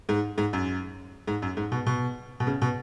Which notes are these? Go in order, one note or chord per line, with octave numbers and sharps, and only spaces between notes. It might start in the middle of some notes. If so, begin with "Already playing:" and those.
G#2
G#2
F#2
G#2
F#2
G#2
B2
B2
B2
C#3
B2